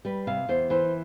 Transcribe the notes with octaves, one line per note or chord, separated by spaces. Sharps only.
G3 B4
C3 F5
E2 C5
E3 C5